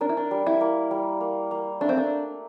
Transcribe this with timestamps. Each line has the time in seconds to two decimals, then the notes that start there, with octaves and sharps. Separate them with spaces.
0.01 D4 A#4
0.09 E4
0.17 D4
0.31 G3
0.47 E4
0.61 A#3
0.91 G3
1.21 A#3
1.51 A#3
1.81 A3 D4
1.89 C4
1.97 D4